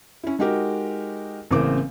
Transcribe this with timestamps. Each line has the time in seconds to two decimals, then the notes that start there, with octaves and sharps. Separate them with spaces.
0.23 C#4 E4
0.39 G#3 D#4 F#4 G4 A#4
1.51 A1 C#3 E3 A#3 C4 D6